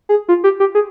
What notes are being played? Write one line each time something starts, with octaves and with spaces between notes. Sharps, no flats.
G#4
F4
G4
G4
G#4